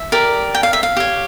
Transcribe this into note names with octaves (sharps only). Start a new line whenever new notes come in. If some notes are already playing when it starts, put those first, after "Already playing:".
Already playing: E5
G4 A#4 D5
G5
F5
E5
F5
G4 C#5